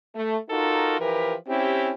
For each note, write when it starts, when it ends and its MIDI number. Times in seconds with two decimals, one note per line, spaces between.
0.15 0.37 57
0.49 0.99 63
0.49 0.99 65
0.49 0.99 66
0.49 0.99 69
0.49 0.99 70
1.00 1.35 52
1.00 1.35 53
1.00 1.35 67
1.00 1.35 70
1.00 1.35 71
1.47 1.92 60
1.47 1.92 61
1.47 1.92 64
1.47 1.92 67